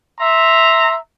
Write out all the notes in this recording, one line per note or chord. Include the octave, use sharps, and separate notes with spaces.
E5 A#5 C6